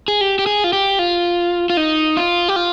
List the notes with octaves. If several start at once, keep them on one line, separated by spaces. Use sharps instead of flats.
G#4
G4
G4
G#4
F4
G4
F4
F4
D#4
F4
G4
F4